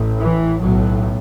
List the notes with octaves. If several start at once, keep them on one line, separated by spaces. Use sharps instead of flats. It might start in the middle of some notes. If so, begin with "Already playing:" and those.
Already playing: A1 A2
E3
B1 A2 F#3